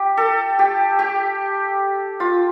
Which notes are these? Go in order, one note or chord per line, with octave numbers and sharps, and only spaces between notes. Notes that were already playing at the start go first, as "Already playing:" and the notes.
Already playing: G4
A4
G4
G4
F4